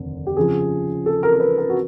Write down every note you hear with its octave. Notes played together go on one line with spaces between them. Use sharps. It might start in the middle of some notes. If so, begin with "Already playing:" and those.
Already playing: F1 D#2 D3
G4
F2 C#3 F3 G#4
A4
A#4
A#4
B4
A#4
F#4